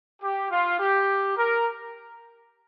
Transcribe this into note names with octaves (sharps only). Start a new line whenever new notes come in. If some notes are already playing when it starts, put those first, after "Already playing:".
G4
F4
G4
A#4